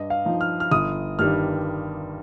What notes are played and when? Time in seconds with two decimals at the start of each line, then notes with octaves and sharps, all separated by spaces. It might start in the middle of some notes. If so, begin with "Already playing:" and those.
Already playing: G2 D#5
0.10 F5
0.25 F3 D#4
0.41 F6
0.60 F6
0.71 G1 D#6
1.19 G2 D#3 G3 F6